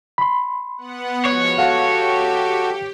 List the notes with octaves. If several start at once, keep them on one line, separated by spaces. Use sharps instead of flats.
B5 C6
B3 F#5
F3 G#3 F#4 C#5
F#4 G4 A4 F5 F#5